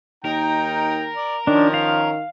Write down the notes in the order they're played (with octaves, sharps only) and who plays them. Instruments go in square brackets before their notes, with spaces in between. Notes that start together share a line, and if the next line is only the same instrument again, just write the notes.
[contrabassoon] D#2 [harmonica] D#4 G5 A#5 [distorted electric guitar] A#4
[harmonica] D5
[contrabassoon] D#3 [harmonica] F3 C#4 [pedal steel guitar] D4
[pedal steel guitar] F5